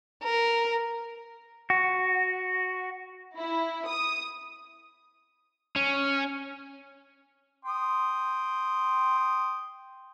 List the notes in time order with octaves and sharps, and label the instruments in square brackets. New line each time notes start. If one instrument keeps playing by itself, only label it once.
[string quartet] A#4
[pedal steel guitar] F#4
[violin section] E4
D#6
[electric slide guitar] C#4
[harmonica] G5 C6 D#6